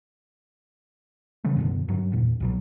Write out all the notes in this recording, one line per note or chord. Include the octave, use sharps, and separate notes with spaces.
C#3 E3 G3 A3
F#2 B2 D3
G2 F#3
E2 A#2
C2 B2 F#3